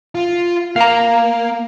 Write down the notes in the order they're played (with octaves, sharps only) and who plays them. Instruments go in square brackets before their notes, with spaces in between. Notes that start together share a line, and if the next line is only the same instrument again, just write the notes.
[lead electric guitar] F4
[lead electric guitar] A#3 [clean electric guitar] F5 A#5